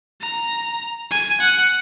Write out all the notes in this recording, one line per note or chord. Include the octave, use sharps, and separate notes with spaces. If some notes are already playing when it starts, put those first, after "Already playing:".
A#5
G#5
F#5